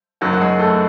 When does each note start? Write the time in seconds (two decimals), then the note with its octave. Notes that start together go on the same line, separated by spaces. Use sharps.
0.21 F#1 F#2 D#3 F#3 F#4
0.33 F#4
0.41 G#3 G#4
0.59 A3 A4